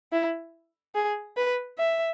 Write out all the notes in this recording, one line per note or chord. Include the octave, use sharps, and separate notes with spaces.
E4
G#4
B4
E5